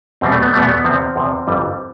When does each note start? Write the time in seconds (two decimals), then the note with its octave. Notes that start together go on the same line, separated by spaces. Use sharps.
0.21 E2 B2 G3 C4
0.32 A3
0.42 B3
0.53 E2 B2 G3 A3
0.63 B3
0.84 E2 C3 F3 C4
1.16 E2 C3 F3
1.47 G1 F2 E3 G3